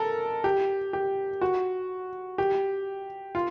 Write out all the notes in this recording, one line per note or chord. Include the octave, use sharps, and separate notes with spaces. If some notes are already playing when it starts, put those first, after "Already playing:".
Already playing: A4 A#4
G4
G4
F#4
G4
F4